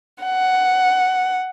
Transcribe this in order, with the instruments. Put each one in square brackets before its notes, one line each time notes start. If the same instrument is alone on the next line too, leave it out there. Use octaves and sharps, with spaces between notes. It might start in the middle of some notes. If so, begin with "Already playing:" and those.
[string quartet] F#5